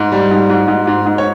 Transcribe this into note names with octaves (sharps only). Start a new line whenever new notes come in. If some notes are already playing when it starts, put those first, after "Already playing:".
Already playing: G#2
G3
G#2
G#2
G#2
G#2
G#2
C#5